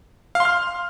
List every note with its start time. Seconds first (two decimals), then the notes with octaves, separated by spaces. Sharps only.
0.35 F5
0.40 C6
0.45 F6